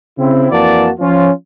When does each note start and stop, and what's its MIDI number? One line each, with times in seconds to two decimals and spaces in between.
0.18 0.50 49
0.18 0.50 60
0.18 0.50 64
0.51 0.89 41
0.51 0.89 52
0.51 0.89 58
0.51 0.89 66
0.51 0.89 74
0.51 0.89 81
1.00 1.30 53
1.00 1.30 61
1.00 1.30 65